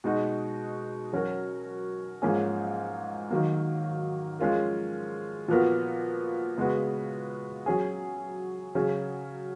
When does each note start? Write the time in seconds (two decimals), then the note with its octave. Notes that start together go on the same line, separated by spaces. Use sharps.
0.04 B2 G#3 D#4 F#4
1.13 F#3 C#4 F#4 A#4
2.22 G#2 F3 A#3 C#4 G#4
3.31 D#3 F#3 A#3
4.39 F3 G#3 C#4 F4 A#4
5.48 A#2 F3 B3 F#4 A#4
6.58 C#3 G#3 B3 F#4
7.66 F#3 C#4 G#4
8.75 C#3 F#3 C#4 G#4